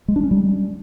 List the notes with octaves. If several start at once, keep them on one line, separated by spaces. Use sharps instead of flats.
G#3
D4
C#4
G3